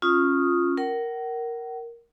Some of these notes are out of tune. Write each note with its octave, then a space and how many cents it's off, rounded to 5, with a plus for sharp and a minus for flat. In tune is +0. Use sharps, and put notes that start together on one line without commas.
C#4 -10 F4 +0 D#6 +0
A#4 +0 F#5 +40